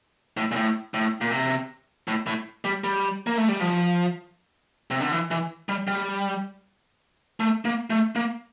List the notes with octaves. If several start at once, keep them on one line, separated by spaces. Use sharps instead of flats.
A2
A#2
A2
A2
A#2
C3
A2
A2
G3
G3
A#3
A3
G3
F3
C3
D3
E3
E3
G3
G3
A3
A#3
A3
A#3